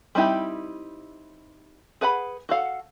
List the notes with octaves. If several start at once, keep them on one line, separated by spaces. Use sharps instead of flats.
G3 C4 D#4 E4 G4
G#4 B4 F#5 A5 B5
F#4 A4 F5 F#5